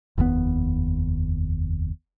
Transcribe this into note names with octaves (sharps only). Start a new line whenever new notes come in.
F1 D#2 B2 B3